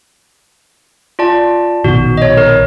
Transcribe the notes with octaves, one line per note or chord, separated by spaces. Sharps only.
F4 D5 A5
A#1 B2 D#3 F#4
C#5 D#5
A#4